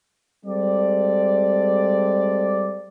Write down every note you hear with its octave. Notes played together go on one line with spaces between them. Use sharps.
G3 G#3 C4 A4 D5